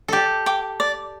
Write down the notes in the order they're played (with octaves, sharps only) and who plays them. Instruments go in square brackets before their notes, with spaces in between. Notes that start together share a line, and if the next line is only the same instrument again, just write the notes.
[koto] G4 A4 [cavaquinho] D5
[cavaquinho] G5 D6
D5